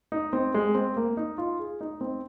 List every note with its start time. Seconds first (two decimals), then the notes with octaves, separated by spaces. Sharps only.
0.12 D#4
0.33 C4
0.54 G#3
0.75 C4
0.97 A#3
1.17 D#4
1.38 F4
1.59 G#4
1.81 D#4
2.01 C4